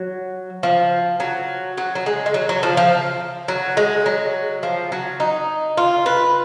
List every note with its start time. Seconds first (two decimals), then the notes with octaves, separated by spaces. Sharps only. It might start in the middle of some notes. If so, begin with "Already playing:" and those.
Already playing: F#3
0.63 F3
1.20 F#3
1.78 F#3
1.95 F#3
2.06 G#3
2.26 G#3
2.34 F#3
2.49 F#3
2.63 F3
2.77 F3
3.48 F#3
3.77 G#3
4.06 F#3
4.63 F3
4.92 F#3
5.20 D#4
5.77 F4
6.06 B4